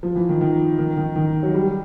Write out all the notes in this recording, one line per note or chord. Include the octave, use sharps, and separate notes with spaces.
F3
E3
D#3
D#3
D#3
D#3
D#3
F#3
G3